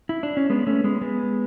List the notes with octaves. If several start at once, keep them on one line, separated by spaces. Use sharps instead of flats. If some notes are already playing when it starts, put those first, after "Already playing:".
E4
D4
C#4
G#3 B3
A3 C#4
G#3 B3
G#3 B3